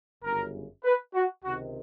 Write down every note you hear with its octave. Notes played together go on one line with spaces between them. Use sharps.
G1 F#2 C#3 A#4
B4
F#4
C#2 C3 D#3 F#4